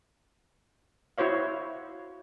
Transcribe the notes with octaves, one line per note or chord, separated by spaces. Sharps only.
E4 F#4 C5 C#5 F5